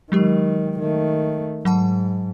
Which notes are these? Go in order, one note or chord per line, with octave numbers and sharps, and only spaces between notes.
D#3 F#3 G#3 G4
D#3 A3
G#2 F#3 F#5 A5